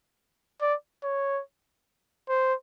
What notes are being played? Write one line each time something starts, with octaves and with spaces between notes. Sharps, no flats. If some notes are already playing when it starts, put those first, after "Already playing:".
D5
C#5
C5